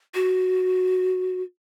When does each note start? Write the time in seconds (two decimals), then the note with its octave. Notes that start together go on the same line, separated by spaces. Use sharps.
0.14 F#4